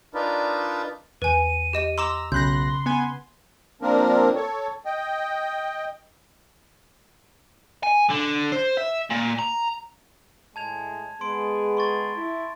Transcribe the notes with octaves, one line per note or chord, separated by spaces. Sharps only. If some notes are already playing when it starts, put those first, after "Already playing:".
D4 D#4 F4 A#4 B4 D5
E2 B4 G#5 D#7
G4 D#5 E7
A#5 C6 D6 E6 E7
B1 C#3 B5 C6 F#6 G6 A#6
B3 G#5
F3 A#3 C4 D4 A#4
A4 C#5
D#5 G5
G#5
D3
C5
E5
A#2
A#5
A2 G#3 A5 G#6 F7
G#3 B3 G#4 C6 D7
C6 C#6 A6
E4